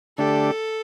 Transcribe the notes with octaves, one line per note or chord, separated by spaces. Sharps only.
D3 A3 D4 G4 A4